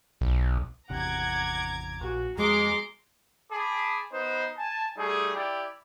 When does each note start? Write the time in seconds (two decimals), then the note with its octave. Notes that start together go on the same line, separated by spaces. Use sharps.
0.21 B1
0.90 G#1 E2 C3 F#5 A#5 D6 G#6
2.01 A#1 F#4
2.38 F2 G#3 G#4 A#5 C6 D6
3.51 G#4 A5 B5 D6
4.12 B3 D#4 B4 C5
4.57 G#5 A5
4.97 G3 A3 D#4 G#4
5.35 E4 G4 D5